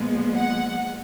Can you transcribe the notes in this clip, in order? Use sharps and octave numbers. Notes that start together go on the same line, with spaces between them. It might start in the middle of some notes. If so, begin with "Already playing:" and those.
Already playing: A#2 F3 G#3 B3
F#5